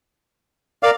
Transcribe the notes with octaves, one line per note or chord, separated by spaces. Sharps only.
A#4 D5 F5